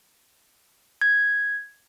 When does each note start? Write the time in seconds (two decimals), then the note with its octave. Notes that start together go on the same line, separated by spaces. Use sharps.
1.01 G#6